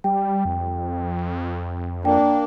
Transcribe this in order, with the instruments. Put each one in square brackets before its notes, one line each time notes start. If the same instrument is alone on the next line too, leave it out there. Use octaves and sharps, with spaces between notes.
[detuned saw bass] G3 [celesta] G5
[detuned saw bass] F2
[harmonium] A#3 D4 [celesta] G5